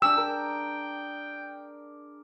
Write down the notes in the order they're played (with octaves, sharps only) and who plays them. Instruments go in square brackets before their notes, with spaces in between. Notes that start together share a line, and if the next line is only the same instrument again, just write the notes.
[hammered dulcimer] D4 G#4 [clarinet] G5 [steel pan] E6
[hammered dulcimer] A#4